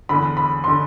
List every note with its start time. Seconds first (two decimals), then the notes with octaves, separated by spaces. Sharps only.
0.09 E2 D3 B5
0.37 B5
0.64 D3 C6